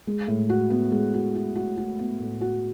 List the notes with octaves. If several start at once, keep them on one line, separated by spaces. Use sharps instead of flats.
G#3
A2
F#4
B3
G#3
F#4
F#4
F#4
F#4
B3
A2
F#4